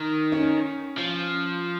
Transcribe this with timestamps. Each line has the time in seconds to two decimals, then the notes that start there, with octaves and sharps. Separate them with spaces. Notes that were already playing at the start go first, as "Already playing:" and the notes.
Already playing: D#3
0.32 C#4
0.97 F3